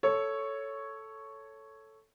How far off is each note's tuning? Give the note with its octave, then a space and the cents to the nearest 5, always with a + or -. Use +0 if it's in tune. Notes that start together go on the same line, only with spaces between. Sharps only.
A4 +0 C#5 +0